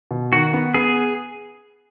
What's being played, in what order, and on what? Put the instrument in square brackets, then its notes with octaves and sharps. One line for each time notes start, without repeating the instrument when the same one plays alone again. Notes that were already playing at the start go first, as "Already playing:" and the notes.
[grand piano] B2
[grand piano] D#3 [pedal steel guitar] F#4
[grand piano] B3
[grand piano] B3 [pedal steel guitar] G#4